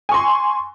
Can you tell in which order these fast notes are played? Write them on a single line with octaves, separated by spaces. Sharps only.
G#5 C#6 C6